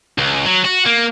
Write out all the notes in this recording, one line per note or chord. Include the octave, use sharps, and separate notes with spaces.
C#2
F#3
F#4
A#3